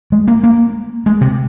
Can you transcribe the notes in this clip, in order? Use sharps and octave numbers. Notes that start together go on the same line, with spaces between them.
G#3
A#3
A#3
G#3
C3